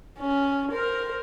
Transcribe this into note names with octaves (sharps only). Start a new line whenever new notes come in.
C#4
A#4 C5